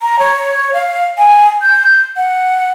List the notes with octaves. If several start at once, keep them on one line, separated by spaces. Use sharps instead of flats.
A#5
C#5
F5
G#5
G6
F#5